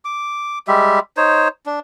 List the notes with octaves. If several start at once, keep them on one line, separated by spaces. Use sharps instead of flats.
D6
G3 G#3 G4 E5
D#4 C5 C#5
D4